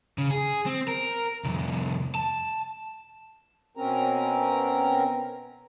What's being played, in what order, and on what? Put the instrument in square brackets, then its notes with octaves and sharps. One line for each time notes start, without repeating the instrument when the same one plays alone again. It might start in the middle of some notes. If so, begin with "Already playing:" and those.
[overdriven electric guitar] C#3
G#4
C4
A#4
C2 F2
A5
[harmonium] B2 C4 C#4 A#4 A#5